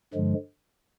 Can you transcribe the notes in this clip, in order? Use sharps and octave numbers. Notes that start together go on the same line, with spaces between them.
G2 D3 F3 G#3